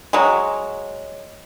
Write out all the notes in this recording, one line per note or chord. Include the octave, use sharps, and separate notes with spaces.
F#3 G#3